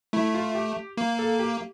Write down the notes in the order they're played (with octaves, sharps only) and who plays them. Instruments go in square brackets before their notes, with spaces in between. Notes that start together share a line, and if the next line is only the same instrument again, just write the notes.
[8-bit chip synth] A3 [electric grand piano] E4
[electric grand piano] F4
G4
[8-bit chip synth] A#3
[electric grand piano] A4
G4